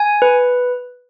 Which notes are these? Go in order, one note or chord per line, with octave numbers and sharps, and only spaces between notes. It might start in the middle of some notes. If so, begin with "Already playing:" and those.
Already playing: G#5
B4